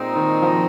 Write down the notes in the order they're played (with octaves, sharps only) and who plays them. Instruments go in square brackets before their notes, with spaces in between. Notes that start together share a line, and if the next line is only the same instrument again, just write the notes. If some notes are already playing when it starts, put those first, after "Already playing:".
Already playing: [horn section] A#2 G#3 C4 D#4
[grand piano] D#3
F3